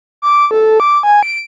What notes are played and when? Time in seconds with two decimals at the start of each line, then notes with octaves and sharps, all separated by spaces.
0.22 D6
0.51 A4
0.80 D6
1.03 G#5
1.23 D7